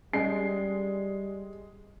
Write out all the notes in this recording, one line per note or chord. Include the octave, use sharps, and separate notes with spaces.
G3 G#3 C#4 C7